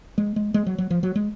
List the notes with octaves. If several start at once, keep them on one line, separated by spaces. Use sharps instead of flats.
G#3
G#3
G#3
F#3
F#3
F3
F#3
G#3